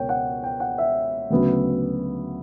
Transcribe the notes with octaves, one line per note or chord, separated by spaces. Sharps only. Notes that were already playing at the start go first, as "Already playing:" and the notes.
Already playing: C#2 B2 A#4 C#5 G5
F#5
G5
F#5
E5
D2 C#3 F#3 B3